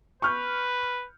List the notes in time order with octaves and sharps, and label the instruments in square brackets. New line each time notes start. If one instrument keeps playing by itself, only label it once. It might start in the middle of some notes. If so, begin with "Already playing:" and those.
[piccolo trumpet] B4 [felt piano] C#6 F6 G6